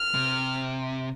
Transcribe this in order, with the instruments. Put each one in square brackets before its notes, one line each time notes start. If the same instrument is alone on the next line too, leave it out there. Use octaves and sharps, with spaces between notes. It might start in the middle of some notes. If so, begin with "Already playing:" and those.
Already playing: [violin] F6
[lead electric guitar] C3